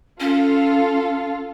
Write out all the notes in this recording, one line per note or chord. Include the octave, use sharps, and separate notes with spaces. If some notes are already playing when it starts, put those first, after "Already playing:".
C#4 F4 A4 F5